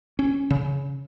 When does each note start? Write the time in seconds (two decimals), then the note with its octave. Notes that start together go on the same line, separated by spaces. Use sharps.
0.19 C#4
0.50 C#3